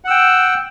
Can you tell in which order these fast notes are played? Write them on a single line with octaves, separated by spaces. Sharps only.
F#5 E6 G5